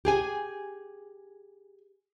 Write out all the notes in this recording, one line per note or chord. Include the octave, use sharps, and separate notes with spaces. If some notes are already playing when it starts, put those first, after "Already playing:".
G4 G#4 G#5